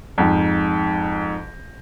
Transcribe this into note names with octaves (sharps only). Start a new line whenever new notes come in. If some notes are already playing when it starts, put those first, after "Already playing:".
F2 G#2